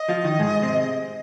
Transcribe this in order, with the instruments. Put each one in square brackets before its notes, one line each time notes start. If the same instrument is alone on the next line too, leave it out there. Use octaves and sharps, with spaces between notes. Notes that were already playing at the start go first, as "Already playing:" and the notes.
Already playing: [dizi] D#5
[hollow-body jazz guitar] F3 F4
D#3 D#4
G#2 G#3
C3 C4